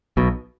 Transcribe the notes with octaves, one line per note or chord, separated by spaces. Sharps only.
B1 B2